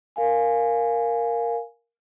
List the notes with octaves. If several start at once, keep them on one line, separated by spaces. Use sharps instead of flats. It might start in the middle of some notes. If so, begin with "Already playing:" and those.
A#4 F5 G#5